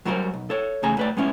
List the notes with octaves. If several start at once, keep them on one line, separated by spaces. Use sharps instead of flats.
F#3 G3 F#4 A#4 C5
B1
A4 C#5
E2 C#3 A3 G#4 G#5 A#5
A2 B4 D5
G#3 B3 C#4 E4